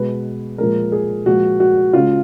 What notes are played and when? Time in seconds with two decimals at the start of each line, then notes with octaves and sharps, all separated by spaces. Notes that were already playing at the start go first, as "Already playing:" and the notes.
Already playing: B2 G#3 B4
0.58 A#2 F3 G#3 A#4
0.92 G#4
1.26 A#2 F3 G#3 F#4
1.60 F#4
1.93 C#3 G#3 F4